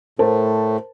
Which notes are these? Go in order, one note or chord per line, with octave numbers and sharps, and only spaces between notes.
A2 A3 A#4 C5 A5